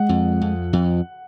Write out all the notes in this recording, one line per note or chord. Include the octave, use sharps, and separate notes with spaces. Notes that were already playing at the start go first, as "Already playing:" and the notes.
Already playing: G#3 F#5
F2
F2
F2